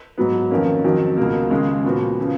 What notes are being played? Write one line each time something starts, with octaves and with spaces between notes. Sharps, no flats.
G#2 F#3 B3
F2 D#3 A#3 C#4
F2 D#3 F#3
C#2 B2 A#3
D#2 C#3 G#3
A#2 F3 B3 F#4
C#3 F3